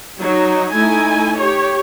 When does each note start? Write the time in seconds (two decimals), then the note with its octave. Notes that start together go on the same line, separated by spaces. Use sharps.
0.17 F#3 D#4
0.73 A3 D#4 E4 G#5
1.38 G4 C#5